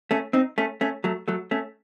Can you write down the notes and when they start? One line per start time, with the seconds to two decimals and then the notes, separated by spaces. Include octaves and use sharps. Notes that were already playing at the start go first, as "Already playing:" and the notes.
0.11 A3 C#4
0.33 C4 D#4
0.58 A3 C#4
0.81 A3 C#4
1.04 F#3 A3
1.28 F#3 A3
1.51 A3 C#4